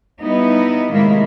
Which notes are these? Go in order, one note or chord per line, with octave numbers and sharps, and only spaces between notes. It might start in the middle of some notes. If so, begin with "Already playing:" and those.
G3 B3 D#4 E4
A2 C3 D#3 G#3 A#3 E4